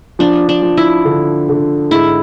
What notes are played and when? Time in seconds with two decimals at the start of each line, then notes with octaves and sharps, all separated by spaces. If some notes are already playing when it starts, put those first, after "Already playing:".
0.19 F3 D4
0.49 D4
0.62 F3
0.77 E4
1.05 D3
1.49 D3
1.91 G#2 E4